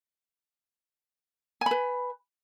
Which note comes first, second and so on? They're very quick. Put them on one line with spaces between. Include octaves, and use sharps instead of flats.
G#5 B5 B4